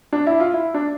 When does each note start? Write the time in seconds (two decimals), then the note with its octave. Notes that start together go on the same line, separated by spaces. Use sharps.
0.13 D4
0.27 E4
0.40 F4
0.54 E4
0.74 D4